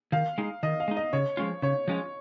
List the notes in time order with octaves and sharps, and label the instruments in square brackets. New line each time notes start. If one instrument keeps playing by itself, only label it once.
[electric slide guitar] D#3 [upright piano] F5
[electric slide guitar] G#3 D#4
[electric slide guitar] D#3 [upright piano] D#5
[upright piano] F5
[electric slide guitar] G#3 D#4
[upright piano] D#5
[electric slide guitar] C#3 [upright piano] C#5
[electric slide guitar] F3 G#3 C#4 F4
[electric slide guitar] C#3 [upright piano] C#5
[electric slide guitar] F3 G#3 C#4 F4